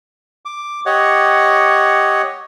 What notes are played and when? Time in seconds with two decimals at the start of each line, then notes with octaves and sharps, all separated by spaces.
0.45 D6
0.86 G4 C#5 D#5 F#5